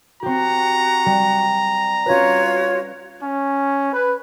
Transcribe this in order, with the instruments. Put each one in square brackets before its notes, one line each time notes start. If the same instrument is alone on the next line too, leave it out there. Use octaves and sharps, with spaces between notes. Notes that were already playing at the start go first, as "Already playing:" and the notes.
[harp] C4 G4 [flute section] F#4 [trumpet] A#5
[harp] G3
[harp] C#4 B4 [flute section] F4 F#4 C#5
[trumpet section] C#4
B4